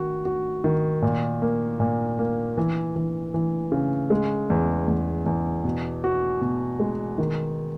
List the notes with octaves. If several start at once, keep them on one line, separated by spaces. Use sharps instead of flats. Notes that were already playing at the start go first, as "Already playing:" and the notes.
Already playing: D#3 F#4
F#4
D#3
A#2
A#3
A#2
A#3
E3
E3
E3
C#3
G#3
E2
E2
E2
B2
F#4
B2
G#3
D#3